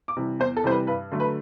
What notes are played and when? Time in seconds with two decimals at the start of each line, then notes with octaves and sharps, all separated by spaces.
0.08 D6
0.16 C3 E3 G3
0.39 E2 C5
0.57 A4
0.64 C3 E3 G3 C5
0.71 B4
0.87 G2 B4
1.11 D3 F#3 A3
1.20 B4